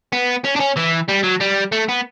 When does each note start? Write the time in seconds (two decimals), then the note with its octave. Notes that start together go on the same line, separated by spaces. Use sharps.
0.12 B3
0.44 C#4
0.56 D4
0.60 C#4
0.77 E3
1.09 G3
1.24 F#3
1.41 G3
1.72 A3
1.89 B3